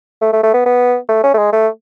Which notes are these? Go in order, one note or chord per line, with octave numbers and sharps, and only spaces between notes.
A3
A3
A3
B3
B3
A3
C#4
A3
G#3
A3